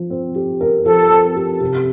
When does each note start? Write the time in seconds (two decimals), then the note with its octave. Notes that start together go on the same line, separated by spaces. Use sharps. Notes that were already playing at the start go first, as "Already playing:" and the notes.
Already playing: F3
0.10 C4
0.36 G4
0.61 A#4
0.85 F3 A4
1.11 C4
1.36 G4
1.61 C3